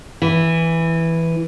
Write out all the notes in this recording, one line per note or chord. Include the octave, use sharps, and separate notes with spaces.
E3